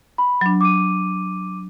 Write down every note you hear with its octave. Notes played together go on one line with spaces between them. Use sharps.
B5
F#3 D4
D6 D#7